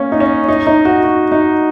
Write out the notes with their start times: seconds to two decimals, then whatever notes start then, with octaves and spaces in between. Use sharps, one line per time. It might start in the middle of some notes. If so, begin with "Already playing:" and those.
Already playing: A#3 C#4
0.12 D#4
0.20 C#4
0.48 D#4
0.67 D#4
0.85 F#4
1.04 F#4
1.32 D#4